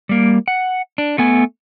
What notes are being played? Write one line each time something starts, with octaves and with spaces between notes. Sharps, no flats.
G3 A#3
F#5
D4
A3 B3 G#5